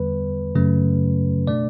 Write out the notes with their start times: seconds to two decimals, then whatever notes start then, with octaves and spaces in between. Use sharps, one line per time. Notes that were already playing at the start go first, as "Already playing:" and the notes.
Already playing: E2 D3 G3 B3 B4
0.55 F#2 C#3 F#3 A3 C#4
1.47 B2 A3 D4 D5